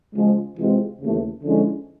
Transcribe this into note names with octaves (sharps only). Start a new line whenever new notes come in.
C#3 F3 G#3
C3 E3 G#3 C4 F4
D#2 C#3 E3 A3
D3 F3 G#3 C#4 E4